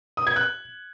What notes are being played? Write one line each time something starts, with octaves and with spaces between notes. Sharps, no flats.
D#6
G#6
F#6